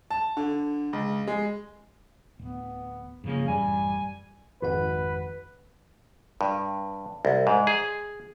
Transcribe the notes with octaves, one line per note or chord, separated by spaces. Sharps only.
A5
D3
C#2
G#3
D1 B3
G2 C#3 F3 A#3
A1 F#2 G3 G#5
G#1 F2 B4 F#5
G2
C2
G#2
G#4